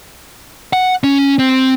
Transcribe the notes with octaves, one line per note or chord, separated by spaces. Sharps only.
F#5
C#4
C4